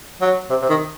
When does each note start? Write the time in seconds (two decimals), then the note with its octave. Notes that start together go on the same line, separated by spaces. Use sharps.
0.22 F#3
0.50 C3
0.62 C3
0.69 D#3